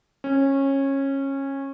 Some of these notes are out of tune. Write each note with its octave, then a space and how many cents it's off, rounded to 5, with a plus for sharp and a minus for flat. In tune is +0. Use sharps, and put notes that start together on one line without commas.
C#4 -20